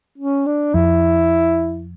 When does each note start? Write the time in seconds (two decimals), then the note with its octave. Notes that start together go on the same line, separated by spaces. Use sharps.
0.18 C#4
0.46 D4
0.74 F2 E4